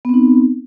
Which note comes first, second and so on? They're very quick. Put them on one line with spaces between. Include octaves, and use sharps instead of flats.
B3 C4 D#4